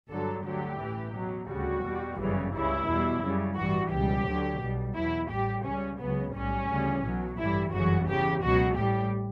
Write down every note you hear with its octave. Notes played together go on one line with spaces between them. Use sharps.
G1 G2 D3 F#3 A4
D2 D3 F#3 G4
A1 A2 E3
E2 B2 F#3
D2 C#3 G3 F#4
E2 B2 G3
G1 F#2 C#3 E3 G3
C#2 C#3 G3 E4
E2 B2 G3
F#2 C#3 G3
A1 G2 E3 G3 F#4
C#2 B2 G3 G4
D2 D3 F#3
B1 B2 G3
E2 B2 F#3 E4
A1 A2 G3 G4
C#2 C#3 G3 C#4
C#2 C#3 F#3 B3
B1 A2 G3 C#4
D2 C#3 E3 G3
B1 B2 F#3
A1 G2 E3 G3 E4
G1 F#2 C#3 E3 F#4
E2 C#3 E3 G4
C#2 B2 F#3 F#4
A1 A2 G3 G4